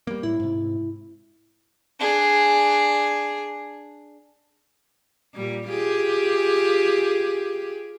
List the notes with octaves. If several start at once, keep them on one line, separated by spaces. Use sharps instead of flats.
G3 A#3
A2 E4
G#2 C3
D4 G#4
A#2 G3
F4 G4 G#4